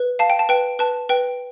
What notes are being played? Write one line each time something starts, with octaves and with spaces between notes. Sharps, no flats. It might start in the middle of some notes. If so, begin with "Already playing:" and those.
Already playing: B4
F5 A5
G5
A5
B4 G5
B4 A5
B4 G5